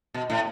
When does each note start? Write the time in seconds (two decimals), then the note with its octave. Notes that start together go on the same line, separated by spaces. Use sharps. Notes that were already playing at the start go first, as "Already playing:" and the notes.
0.14 B2
0.30 A2